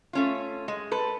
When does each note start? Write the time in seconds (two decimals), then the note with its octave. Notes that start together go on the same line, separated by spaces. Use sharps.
0.13 A3 C#4 F4
0.68 G#3
0.91 A4 B4